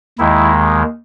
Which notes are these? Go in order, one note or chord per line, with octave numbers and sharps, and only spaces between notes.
D#2 D#3 G#3 E4